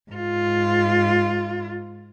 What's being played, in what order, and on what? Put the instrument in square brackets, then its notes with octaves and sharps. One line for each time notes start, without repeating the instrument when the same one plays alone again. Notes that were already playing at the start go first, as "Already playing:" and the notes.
[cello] G#2 F4